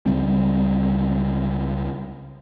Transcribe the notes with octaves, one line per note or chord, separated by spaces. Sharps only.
C#2 C#3 G3 C4